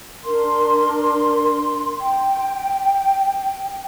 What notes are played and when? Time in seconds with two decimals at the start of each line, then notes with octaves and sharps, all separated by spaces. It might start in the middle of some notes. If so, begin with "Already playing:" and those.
0.24 D4 A#4 C6
2.00 G5